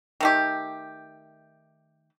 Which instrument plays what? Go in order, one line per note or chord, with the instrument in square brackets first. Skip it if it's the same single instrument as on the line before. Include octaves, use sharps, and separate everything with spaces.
[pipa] D#3 A3 G4